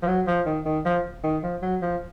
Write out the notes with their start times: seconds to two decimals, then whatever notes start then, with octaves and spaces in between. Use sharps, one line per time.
0.02 F3
0.07 F#3
0.27 F3
0.46 D#3
0.65 D#3
0.85 F3
1.24 D#3
1.43 F3
1.62 F#3
1.82 F3